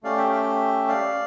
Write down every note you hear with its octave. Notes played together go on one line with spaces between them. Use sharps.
A3 C#4 G4 D5 F5
E5 G5
E5 G5
D5 F5